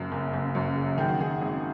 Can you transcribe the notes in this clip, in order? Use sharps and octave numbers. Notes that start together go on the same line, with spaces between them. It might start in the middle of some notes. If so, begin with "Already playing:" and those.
Already playing: F#1 F#2
F#1
F#1
F#2
C#3
D#3 G#4
F#4
D#3 G#4
G#1